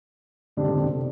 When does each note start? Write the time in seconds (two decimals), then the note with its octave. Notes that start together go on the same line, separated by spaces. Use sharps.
0.57 F2 D3 D#3 G3 D4
0.67 D3
0.77 B2
0.87 C3